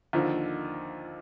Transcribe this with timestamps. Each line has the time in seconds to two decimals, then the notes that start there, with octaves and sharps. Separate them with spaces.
0.13 D#2 D3 F3